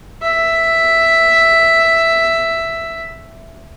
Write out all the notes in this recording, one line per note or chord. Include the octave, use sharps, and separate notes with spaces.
E5